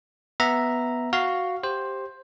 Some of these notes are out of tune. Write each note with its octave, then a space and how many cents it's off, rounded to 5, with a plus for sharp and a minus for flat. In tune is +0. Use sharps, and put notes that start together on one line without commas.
B3 +0 E5 +0 A#5 +0
F#4 +0 F5 +0
G4 +0 C5 +10